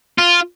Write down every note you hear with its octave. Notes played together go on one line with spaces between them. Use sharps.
F4